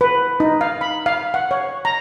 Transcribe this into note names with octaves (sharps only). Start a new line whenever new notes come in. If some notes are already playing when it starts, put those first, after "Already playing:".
B4
D#4
F5
B5
F5
F#5
C#5
A#5